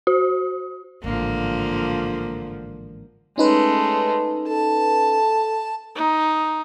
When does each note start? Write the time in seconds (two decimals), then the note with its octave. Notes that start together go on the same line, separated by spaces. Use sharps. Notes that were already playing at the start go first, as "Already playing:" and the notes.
0.07 F#4
1.04 A1 G#2 D3 F3 A#3
3.38 G#3 A3 C#4 D#4 B4
4.48 A4 A5
5.95 D#4